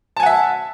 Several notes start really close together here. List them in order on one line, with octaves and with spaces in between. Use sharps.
A5 G#5 F#5 E5